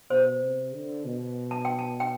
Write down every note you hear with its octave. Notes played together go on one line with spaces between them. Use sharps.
B2 C5
C3
D3
B2
A5
G5
A5
G5